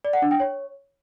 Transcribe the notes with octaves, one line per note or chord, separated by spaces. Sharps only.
D5
F#5
D4
G5
C#5